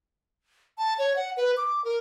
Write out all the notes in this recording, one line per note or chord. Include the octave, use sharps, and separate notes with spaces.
A5
C#5
F#5
B4
D6
A#4